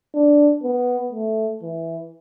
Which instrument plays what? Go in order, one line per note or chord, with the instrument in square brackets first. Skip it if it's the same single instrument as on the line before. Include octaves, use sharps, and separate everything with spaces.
[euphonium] D4
B3
A3
E3